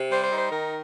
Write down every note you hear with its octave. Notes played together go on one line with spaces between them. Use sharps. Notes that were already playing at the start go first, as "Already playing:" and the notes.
Already playing: C3
G3 C5
C5
D#4
C5
D#3 A#4